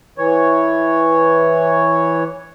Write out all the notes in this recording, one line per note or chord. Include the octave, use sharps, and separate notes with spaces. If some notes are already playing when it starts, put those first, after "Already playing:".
E3 C#5